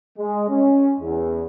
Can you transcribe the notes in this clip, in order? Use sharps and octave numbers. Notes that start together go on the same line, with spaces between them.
G#3
C#4
E2